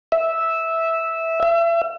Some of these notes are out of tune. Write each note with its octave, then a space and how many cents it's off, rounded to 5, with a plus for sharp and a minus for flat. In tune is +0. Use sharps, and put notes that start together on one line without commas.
E5 -10
E5 +35